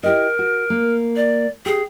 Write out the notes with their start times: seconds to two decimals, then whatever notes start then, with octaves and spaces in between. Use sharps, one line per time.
0.03 E4 G4 A#4 D#5
0.39 F#4
0.70 A#3
1.16 D5
1.66 G4 G#4